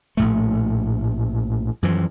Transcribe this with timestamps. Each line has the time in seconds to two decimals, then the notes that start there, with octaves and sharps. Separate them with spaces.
0.17 A#1 A2 A3
1.83 F#2 E3 F3